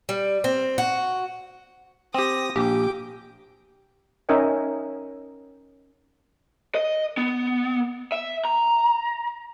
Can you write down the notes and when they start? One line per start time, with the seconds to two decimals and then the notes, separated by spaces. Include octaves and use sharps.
0.09 G3
0.44 C4
0.78 F#4
2.14 C4 G4 D#6 A#6
2.56 A#1 G4 G5 D6
4.29 C#4 D#4 A#4 D#5 E5 G5
6.75 D#5
7.17 B3
8.12 E5
8.45 A#5